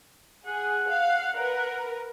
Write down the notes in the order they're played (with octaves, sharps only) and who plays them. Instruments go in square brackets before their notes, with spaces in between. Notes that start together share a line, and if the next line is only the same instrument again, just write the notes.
[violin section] G#4 [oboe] F#5
[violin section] F5
A#4 B4